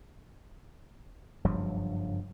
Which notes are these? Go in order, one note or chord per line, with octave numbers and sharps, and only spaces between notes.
F#1 G2 F3 F#3